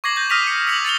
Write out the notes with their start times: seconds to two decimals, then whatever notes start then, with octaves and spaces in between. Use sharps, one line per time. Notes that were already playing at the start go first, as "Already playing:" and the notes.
0.04 C#6 D6 G#6 A#6 C7 F#7
0.16 G6 A#6
0.30 D#6 F6 A#6 B6 D#7 F7
0.47 C#7
0.67 E6 B6 C#7 F7 F#7
0.85 A6 C#7 F7 G7